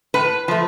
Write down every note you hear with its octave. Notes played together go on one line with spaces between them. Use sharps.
A2 B4
F3 A3